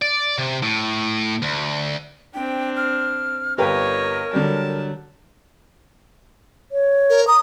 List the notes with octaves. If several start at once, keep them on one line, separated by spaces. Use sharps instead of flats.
D5
C3
A2
D2
C4 D4 G5
F6
G1 G4 A#4 B4 C#5 D#5
D3 F#3 G3 A5
C#5
A#4
A#5 D#6